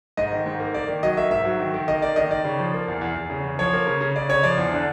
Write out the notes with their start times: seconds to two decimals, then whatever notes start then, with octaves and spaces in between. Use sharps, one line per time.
0.17 G#2 D#5
0.32 D#3
0.46 G#2
0.60 A#3
0.74 A#3 D5
0.88 D#3
1.03 F#3 D#5
1.17 A#3 E5
1.31 G#2 E5
1.45 F#3
1.60 D#3
1.74 D#3
1.88 A#3 D#5
2.02 A#3 D5
2.16 D#3 D#5
2.31 D#3 D5
2.45 C#3
2.59 F3
2.74 A#3
2.88 E2
3.01 E2
3.16 E2
3.30 C#3
3.44 E2
3.59 F3 C#5
3.73 A#3
3.87 C#3
4.01 C#3
4.15 C#3 D5
4.29 C#3 C#5
4.43 F3 D5
4.58 E2
4.72 D3